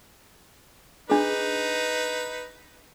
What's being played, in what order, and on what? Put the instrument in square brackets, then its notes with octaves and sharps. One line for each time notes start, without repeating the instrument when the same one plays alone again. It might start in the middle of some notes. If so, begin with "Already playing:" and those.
[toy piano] D4 G#4 [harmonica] D#4 B4